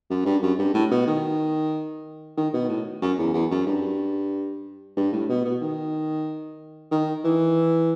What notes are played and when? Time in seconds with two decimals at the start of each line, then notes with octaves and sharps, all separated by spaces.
0.10 F#2
0.25 G2
0.42 F#2
0.59 G2
0.74 A2
0.91 B2
1.07 D#3
2.37 D#3
2.53 B2
2.69 A2
3.02 F#2
3.18 E2
3.34 E2
3.51 F#2
3.66 G2
4.97 G2
5.13 A2
5.29 B2
5.45 B2
5.61 D#3
6.91 D#3
7.24 E3